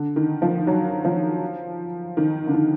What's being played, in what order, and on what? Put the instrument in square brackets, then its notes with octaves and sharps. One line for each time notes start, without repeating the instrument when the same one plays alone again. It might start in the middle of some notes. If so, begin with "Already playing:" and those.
Already playing: [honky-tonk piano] D3
D#3
F3
F#3
F3
D#3
D3
D#3